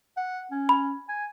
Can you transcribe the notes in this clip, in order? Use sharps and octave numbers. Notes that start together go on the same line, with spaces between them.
F#5
C#4
B5
G#5